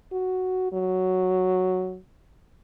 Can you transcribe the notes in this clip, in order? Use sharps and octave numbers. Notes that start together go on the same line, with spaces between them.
F#4
F#3